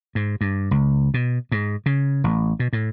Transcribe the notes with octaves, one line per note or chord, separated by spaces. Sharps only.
G#2
G2
C#2
B2
G#2
C#3
A1
B2
A2